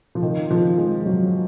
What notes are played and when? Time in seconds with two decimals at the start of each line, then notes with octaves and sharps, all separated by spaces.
0.15 F3
0.23 D#3
0.51 F3
0.78 G#3
1.06 F#3